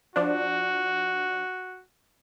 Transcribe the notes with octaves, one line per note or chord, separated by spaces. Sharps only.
F3 D4 F#4